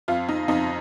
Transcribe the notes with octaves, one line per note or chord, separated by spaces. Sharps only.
F2 F4
D#4
F2 D#4